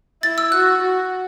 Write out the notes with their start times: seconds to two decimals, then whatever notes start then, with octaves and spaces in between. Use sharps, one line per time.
0.23 E4 A6
0.38 E6
0.52 F#4 F#6
0.81 F#4